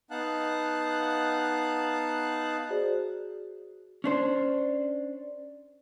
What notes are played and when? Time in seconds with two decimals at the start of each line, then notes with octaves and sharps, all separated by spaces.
0.11 B3 D#4 F5 F#5 A5 F#6
2.69 F#4 G#4 C5 D5
4.04 C#4 D4 C5